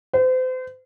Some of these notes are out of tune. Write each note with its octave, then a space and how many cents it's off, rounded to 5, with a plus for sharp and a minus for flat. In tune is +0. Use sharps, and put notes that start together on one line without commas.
C5 -35